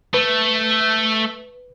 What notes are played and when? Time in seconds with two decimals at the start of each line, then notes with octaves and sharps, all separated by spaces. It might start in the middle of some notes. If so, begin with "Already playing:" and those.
0.14 A3 B4